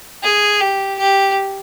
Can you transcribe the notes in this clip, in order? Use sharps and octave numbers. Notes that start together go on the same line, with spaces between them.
G#4
G4
G4